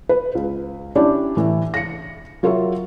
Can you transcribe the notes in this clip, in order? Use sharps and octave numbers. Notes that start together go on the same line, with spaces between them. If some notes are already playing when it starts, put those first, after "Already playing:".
B4
C#2
C#4 D4 E4 G4 D5
A2 E3
A#6 C#7
F#3 F4 A#4 C#5 E5 F5